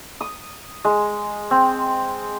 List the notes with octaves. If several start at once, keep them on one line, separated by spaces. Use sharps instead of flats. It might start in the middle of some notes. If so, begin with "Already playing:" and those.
D#6
G#3
C4